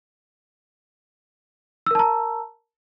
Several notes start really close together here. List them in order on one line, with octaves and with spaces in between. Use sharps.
E6 A#4 A5 A#5